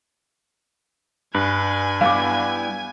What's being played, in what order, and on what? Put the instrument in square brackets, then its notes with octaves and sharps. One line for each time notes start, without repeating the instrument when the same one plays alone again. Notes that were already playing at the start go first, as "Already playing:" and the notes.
[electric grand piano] G2 [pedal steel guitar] B4 [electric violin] G#5
[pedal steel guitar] G3 B3 E4 [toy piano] F5 D6